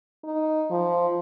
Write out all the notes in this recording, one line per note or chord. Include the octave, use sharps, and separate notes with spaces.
D#4
F3